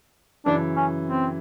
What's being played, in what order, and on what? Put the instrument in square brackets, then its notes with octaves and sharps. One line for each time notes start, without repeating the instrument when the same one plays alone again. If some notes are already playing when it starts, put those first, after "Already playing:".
[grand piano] F#2 C#3 E3 [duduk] D4
[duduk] C#4
C4